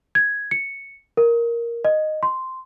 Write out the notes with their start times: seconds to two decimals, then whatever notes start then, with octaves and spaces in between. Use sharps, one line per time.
0.15 G#6
0.51 C#7
1.17 A#4
1.84 D#5
2.23 C6